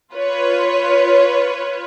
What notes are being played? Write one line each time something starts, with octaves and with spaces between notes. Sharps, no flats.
F4 B4 C#5